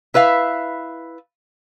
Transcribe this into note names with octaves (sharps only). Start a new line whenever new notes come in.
E4 B4 E5 F5